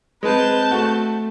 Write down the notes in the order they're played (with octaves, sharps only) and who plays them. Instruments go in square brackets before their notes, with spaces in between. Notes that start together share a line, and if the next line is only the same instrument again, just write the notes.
[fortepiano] G#3 [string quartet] C4 A5 G6 [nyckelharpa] B4
[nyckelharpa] A3 [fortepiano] F#4